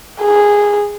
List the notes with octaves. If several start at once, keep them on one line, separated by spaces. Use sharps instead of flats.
G#4